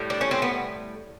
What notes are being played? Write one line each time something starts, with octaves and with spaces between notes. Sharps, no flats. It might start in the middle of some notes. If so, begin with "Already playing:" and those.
Already playing: A2 G3
D4
C#4
C4
B3